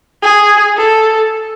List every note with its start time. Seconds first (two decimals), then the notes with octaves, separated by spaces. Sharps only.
0.23 G#4
0.78 A4